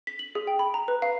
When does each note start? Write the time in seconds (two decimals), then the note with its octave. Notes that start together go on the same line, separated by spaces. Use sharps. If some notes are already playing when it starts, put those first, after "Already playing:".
0.07 B6
0.19 F#7
0.35 G#4
0.47 G5
0.59 B5
0.74 A#5
0.88 B4
1.02 F5